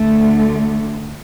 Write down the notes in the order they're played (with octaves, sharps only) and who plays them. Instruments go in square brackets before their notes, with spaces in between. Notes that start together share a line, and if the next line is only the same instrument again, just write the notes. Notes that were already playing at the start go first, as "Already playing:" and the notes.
Already playing: [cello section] D2 D3 A3